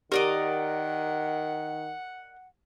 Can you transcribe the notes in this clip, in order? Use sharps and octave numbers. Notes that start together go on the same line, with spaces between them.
D#3 G4 A#4 D5 D#5 F#5